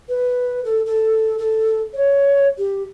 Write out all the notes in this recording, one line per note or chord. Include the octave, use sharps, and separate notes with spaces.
B4
A4
A4
A4
C#5
G4